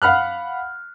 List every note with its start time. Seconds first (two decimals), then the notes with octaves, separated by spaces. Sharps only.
0.02 F5 F#5 B5 F6 F#6